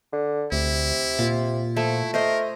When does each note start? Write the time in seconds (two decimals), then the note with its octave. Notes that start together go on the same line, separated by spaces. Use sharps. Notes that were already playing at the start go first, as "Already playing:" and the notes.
0.13 D3
0.52 D2 C3 E4
1.19 A#2 F4
1.77 F3 A3 E4
2.14 A3 A#4 C5 D#5